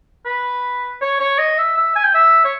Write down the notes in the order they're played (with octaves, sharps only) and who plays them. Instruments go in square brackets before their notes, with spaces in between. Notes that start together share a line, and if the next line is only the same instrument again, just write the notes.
[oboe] B4
C#5
C#5
D#5
E5
E5
G#5
G5
E5
C#5